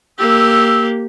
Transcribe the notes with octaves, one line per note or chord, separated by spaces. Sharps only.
A#3 G4 E6